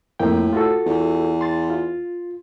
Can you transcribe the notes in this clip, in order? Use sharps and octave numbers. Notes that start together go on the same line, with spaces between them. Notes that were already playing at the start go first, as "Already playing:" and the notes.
F2 A2 A#3 G5
F4 F#4 A4
E2
C6 A6
F4